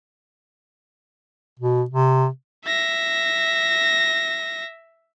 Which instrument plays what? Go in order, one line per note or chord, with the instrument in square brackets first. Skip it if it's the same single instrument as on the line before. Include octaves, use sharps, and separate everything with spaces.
[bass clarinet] B2
C3
[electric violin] E5 A#6